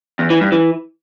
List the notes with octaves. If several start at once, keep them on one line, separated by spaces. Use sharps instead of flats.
E2
E3
G2
E3